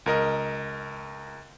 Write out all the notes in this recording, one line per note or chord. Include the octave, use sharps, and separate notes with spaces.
C#2 A#4 D#5